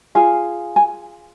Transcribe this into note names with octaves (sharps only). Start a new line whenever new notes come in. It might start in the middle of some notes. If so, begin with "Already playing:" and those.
F4 G#4 F5 G#5
G#5